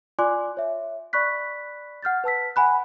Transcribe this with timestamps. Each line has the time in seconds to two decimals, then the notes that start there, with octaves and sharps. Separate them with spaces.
0.19 F4 D5 G#5 C6 D6 F#6
0.57 C#5 E5
1.13 D5 B5 C#6 F#6 B6
2.03 F#5 F6 G6 A6
2.24 B4 A5 E6 B6
2.56 F#5 G#5 B5 F#6